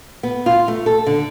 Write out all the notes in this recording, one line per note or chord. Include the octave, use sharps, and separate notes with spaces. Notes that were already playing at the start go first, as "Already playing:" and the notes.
B3
F4
A3
A4
D3